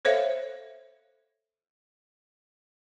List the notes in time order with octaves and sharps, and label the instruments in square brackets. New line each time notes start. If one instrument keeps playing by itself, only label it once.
[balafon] A4 C5 C#5 E5 F5